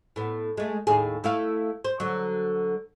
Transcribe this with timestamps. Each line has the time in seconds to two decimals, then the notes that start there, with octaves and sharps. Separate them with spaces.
0.16 A2 B3
0.57 G#3 A3
0.87 D#2 A2 G#4
1.24 A3 E4 F5
1.85 C5
2.00 D3 F#3